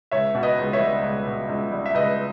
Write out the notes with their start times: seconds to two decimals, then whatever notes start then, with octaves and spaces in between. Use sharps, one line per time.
0.11 C#2 C#5 E5
0.35 B2
0.43 B4 D#5
0.58 C#2
0.73 C#5 E5
0.80 G3
1.03 C#2
1.27 B2
1.49 C#2
1.72 G3
1.86 E5
1.94 C#2 B4 D#5